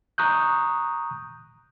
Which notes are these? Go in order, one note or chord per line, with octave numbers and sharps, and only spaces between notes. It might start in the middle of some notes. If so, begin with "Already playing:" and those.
A#5 C#6 D#6 F#6 G6